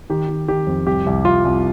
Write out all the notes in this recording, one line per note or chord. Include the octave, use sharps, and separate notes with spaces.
D#3 G4
D#3
D#3 G4
F2
C2 G4
C2
C2 F4
C2